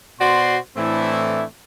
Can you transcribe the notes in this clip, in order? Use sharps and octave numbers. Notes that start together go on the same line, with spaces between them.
B2 F#4 C5 D5 C6
A2 E3 A3 C4 D4 E4